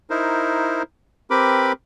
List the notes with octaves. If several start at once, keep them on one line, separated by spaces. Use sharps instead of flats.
D#4 E4 A#4 C5
C4 G4 A#4 B4 B5 D6